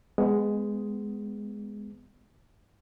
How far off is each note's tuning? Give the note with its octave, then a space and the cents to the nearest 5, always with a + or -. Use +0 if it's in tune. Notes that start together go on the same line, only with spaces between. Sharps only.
G#3 +0 B3 +20